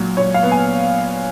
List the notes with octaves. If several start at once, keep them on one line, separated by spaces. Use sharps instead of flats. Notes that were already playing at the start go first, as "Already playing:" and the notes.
Already playing: A#2 F#3
A#2 C#5
F5
B3
G#5